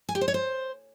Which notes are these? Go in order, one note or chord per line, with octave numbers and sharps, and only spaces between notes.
G#5
G4
C5
C#5
C5